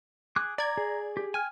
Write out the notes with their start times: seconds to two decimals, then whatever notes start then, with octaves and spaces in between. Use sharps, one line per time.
0.36 G#4 D6 F#6
0.58 D5 A#5 G#6
0.77 G#4
1.17 G4
1.34 G5 G#5 F6